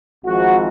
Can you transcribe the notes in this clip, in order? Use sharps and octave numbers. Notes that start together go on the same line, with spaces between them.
G#1 G#2 F3 F#4